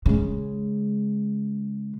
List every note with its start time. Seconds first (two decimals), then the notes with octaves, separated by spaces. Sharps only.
0.06 C#3 G#3